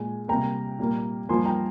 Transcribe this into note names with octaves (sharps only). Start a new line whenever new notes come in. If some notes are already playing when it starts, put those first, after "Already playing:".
Already playing: A#2 G#3 G#5
C3 G3 A#3 G5 A#5
A#2 G3 A#3
G2 F3 A#3 G#5 C6
G5 A#5